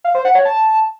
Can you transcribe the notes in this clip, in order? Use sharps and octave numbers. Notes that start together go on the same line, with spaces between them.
F5
C5
F#5
C#5
A5